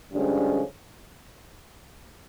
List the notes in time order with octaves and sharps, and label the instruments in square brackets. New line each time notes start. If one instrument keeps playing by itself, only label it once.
[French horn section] G2 D3 F3 G#3 C#4